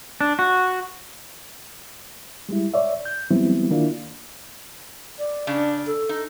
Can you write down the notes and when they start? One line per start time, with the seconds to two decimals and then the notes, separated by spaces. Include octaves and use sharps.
0.21 D4
0.39 F#4
2.49 G3 G#3 E4
2.74 C#5 D5 E5
3.05 G6
3.31 E3 F#3 G3 B3 C4 E4
3.70 D#3 A#3 D4 E4 F4
5.19 D5
5.47 C#3 D4
5.87 A4
6.09 D#4